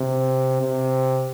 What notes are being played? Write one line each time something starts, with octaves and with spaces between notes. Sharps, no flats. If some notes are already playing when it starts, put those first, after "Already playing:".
Already playing: C3
C3